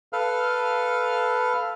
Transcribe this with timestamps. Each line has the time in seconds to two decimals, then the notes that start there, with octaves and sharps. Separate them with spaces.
0.13 A4 B4 F5 F6